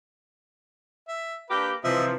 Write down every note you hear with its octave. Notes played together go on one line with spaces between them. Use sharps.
E5
A#3 D4 G4 B4
C3 E3 F3 D#5 E5